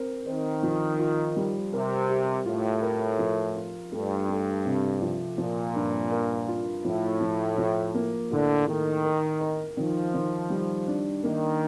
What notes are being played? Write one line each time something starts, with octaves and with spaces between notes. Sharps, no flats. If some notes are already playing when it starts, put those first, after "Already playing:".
Already playing: C4 A#4
D#3 C4
F3
F4
G3
C3 A#4
G4
A2 F4
A#4
F3
F4
G2 A3
A3
C3
F3
A#2 F3
G2
A#4
F4
A2 F3
F3
F3
A#3
A2 D3
D#3 A3
A#4
A#4
D#3 F3
D#3
G3
D4
D#3 A#3